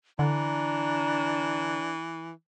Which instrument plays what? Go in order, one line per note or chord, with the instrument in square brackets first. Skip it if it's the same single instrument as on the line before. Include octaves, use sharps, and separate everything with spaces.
[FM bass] D3 [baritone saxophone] E3 [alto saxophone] D4 [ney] A#5